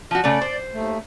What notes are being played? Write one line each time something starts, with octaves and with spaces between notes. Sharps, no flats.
F3 F#4
C#3 A3 D5
C5
D#2 A3